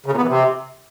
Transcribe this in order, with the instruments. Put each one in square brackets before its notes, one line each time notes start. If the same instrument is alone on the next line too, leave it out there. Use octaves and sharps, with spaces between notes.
[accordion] C#3
A#2
B3
E3
C3